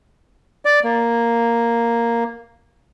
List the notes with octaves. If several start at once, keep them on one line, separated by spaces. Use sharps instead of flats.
D5
A#3